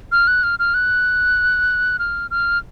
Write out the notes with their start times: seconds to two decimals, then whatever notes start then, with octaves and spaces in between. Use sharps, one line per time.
0.12 F6
0.27 F#6
0.43 F6
0.59 F6
0.74 F#6
1.99 F6
2.31 F6